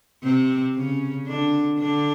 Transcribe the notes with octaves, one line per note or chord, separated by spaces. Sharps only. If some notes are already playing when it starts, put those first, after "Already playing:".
C3 C4
C#3 C#4
D3 D4
D3 D4